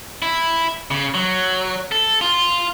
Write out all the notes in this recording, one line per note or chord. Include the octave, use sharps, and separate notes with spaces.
E4
C#3
F#3
A4
F4